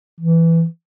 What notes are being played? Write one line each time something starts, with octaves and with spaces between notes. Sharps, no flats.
E3